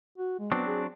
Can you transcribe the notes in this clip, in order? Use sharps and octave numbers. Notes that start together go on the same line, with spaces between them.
F#4
G#3
F#3 B3 C4 D4
G#4